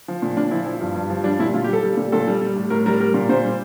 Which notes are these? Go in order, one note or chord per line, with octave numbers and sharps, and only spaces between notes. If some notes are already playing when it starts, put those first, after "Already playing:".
F3
A#2
A#2 D4
F3 E4
F3
G2
G2
F3
G3 D4
A#2 E4
A#2 F4
G4
G3 A4
G3
A#2
A#2 A4
G3
G3
A2
A2 A#4
G3 A#4
G3 A#4
A#2
A#2 C5
G3